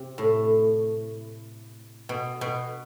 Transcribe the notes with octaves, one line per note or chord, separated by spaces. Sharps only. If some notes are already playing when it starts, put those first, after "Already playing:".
Already playing: C3
A2
B2
B2